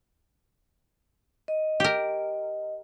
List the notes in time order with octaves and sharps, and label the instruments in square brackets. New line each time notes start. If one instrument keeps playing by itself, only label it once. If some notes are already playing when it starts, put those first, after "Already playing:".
[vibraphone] D#5
[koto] G4 A#4